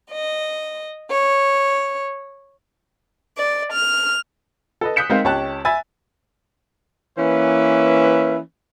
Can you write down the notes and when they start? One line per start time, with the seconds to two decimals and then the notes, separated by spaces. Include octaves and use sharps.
0.12 D#5
1.10 C#5
3.37 D5
3.72 F6
4.81 A4 B4 D#5
4.96 D#6 F#6 G6 B6 C#7 E7
5.10 G#3 C4 D#4 A#4 C5 F5
5.24 C#2 G4 C#5 A5 F#6
5.65 E5 G#5 B5 E6 A6
7.19 E3 A#3 C#4 B4 E5